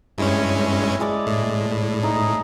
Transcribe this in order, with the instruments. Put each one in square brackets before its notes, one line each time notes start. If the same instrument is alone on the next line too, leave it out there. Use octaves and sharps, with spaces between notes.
[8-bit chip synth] G2 G#3 C#4 [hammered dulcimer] E4
[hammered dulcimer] G#3 D5 D6
[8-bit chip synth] A2
[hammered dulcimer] D#4